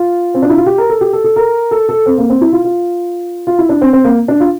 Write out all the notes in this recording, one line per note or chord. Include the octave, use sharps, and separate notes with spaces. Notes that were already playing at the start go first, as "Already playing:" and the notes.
Already playing: F4
C4
D4
E4
F4
G4
A#4
A4
G4
A4
A4
A#4
A4
A4
C4
A#3
C4
E4
F4
F4
F4
E4
D4
C4
C4
A#3
D4
F4